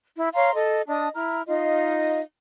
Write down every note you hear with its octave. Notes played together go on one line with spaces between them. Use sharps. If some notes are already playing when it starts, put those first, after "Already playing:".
E4
C#5 F5 A#5 C6
A4 D#5
D4 D#5 A5 D#6
E4 A#5 F6
D#4 F4 D#5 F5